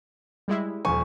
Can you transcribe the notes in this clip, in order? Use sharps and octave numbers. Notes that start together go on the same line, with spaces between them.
G3 G#3 E4
D#1 F3 G#5 C#6